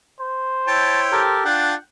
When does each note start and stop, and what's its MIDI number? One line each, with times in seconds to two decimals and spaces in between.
0.20 1.38 72
0.67 1.23 64
0.67 1.23 73
0.67 1.23 79
0.67 1.00 81
1.12 1.44 67
1.12 1.44 69
1.12 1.44 70
1.45 1.74 62
1.45 1.74 65
1.45 1.75 78
1.45 1.75 79
1.45 1.74 81